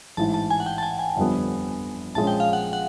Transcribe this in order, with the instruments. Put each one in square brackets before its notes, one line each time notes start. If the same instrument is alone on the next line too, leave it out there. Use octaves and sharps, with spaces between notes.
[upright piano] A1 G#2 E3 [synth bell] A5
[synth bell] A5
G#5
F#5
G5
A5
G#5
G#5
[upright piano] G1 F2 D3 G3 B3
[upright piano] A#1 A#2 F3 G#3 C#4 [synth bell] A5
[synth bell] G5
F5
F#5
F#5